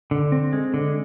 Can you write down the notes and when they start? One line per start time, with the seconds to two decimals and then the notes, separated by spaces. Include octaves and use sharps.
0.11 D3
0.32 C4
0.53 G#3
0.74 D3